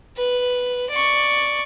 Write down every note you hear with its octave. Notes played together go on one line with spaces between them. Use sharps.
B4
D5 C#6